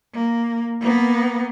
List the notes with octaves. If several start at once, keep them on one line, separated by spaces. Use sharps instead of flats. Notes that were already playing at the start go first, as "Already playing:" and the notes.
A#3
A#3 B3